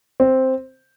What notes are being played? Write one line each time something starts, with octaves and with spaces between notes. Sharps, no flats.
C4